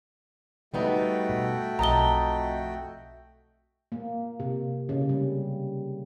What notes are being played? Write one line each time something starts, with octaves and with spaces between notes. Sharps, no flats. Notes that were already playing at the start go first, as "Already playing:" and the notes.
G3 A3 B3 D#4 F#4 G5
B2
B1 F2 D#5 A5 A#5 G7
A#3
C3
C#3
G3